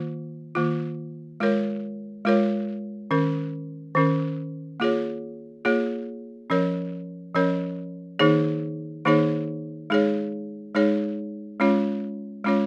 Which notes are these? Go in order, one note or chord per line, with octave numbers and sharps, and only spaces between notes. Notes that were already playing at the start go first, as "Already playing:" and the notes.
Already playing: D#3 A#3 F4
D#3 A#3 F4
G#3 F4 A#4 C#5
G#3 F4 A#4 C#5
D#3 C#4 A#4
D#3 C#4 A#4
A#3 F4 G#4 C#5
A#3 F4 G#4 C#5
F3 C#4 A#4 C#5
F3 C#4 A#4 C#5
D#3 A#3 D#4 G#4 C#5
D#3 A#3 D#4 G#4 C#5
G#3 D#4 G#4 C#5
G#3 D#4 G#4 C#5
G#3 C#4 F4 C#5
G#3 C#4 F4 C#5